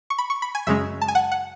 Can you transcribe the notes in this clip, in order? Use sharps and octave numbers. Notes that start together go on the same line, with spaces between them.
C#6
B5
C#6
B5
G#5
F#2 C#3 G#3 C#4 E5
A5
G#5
F#5
F#5